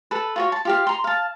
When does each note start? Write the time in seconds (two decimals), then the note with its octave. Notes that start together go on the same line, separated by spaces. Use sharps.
0.11 A4 B4
0.36 F4 F#4 C#5
0.52 A5
0.65 F4 G4 F5
0.87 A#5 C6
1.04 F5 A5